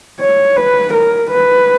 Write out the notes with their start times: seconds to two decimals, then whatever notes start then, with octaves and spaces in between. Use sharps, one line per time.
0.20 C#5
0.56 B4
0.93 A#4
1.31 B4